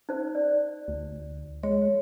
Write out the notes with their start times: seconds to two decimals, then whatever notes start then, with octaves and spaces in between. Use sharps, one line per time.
0.09 D#4 C5
0.35 D5
0.88 D2
1.63 G#3 C#5